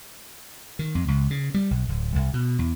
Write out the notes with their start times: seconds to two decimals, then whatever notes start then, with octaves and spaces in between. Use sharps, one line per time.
0.79 D#3
0.95 F2
1.08 C#2
1.30 C#3
1.54 G3
1.71 B1
1.89 D1
2.15 C2
2.34 B2
2.59 E2